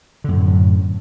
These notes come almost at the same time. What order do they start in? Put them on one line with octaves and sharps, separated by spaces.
D3 F#2 A2